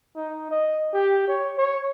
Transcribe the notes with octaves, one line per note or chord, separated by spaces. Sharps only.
D#4
D#5
G4
C#5
C#5